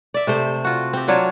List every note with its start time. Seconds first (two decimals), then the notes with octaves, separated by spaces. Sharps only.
0.14 D5 E5
0.27 C3 A3 C5
0.65 F4 F#4
0.93 C4 G4
1.08 F#3 D4 F4 C#5